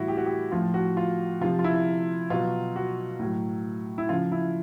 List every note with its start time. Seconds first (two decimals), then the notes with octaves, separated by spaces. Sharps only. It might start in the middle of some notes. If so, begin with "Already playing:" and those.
Already playing: A2 E3 G3 E4 F#4
0.08 G4
0.17 F#4
0.26 G4
0.52 A2 F3 F4
0.74 F#4
0.97 F4
1.41 C3 F3 F4
1.59 F4
1.64 E4
2.30 B2 F#3 F4
2.76 F#4
3.20 A2 F#3
3.98 E4
4.09 C#3 F3 F4
4.32 E4